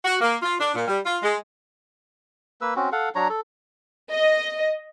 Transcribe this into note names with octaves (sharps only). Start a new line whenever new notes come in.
F#4
A#3
F4
D4
A#2
G3
F4
G#3
A#3 B4 E6
C4 C#4 F#4
A4 F5 F#5
F#3 D4 C#5 A#5
A4
D#5